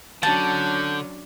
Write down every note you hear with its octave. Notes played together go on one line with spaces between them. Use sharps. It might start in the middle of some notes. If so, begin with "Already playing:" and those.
D3 F#3 C#4 D4 A5 G6